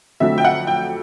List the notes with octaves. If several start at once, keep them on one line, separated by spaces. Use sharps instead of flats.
F2 D3 F#3 A3 E5
G5
F#5
G5